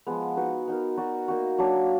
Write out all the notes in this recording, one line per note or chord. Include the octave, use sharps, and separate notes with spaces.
F3 G#3 B3
D#4 F#4 B4
B3 D#4 A#4
D#4 F#4 D5
A#3 D#4 F#4
F#3 A#3 D4